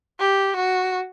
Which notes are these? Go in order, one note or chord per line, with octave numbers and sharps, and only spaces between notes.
G4
F#4